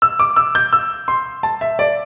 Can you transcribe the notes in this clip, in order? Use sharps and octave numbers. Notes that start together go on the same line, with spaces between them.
E6
D6
E6
G6
E6
C6
A5
E5
D5